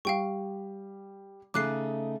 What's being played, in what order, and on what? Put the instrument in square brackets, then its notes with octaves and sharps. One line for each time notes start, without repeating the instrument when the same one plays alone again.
[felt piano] G3 [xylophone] F5 G5 C#6
[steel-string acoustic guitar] C#3 A3 D#4 [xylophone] D6 F#6 C7